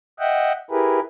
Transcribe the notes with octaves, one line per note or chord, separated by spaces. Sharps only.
D#5 E5 F#5 G5
E4 G4 G#4 A#4 B4